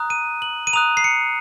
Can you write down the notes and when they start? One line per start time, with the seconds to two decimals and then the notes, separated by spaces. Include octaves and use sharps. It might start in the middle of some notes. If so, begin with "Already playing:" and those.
Already playing: A#5 D#6 F#6
0.10 D#7
0.42 F#7
0.67 D#7
0.73 A#5 D#6 F#6 F7
0.97 C7
1.04 C#7